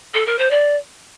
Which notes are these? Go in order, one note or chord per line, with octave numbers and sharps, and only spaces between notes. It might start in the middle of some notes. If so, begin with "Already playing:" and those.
A4
A#4
C5
D5